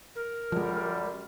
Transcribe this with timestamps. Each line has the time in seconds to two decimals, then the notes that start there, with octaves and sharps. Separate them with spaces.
0.16 A#4
0.52 F#2 D3 F3 G3 G#3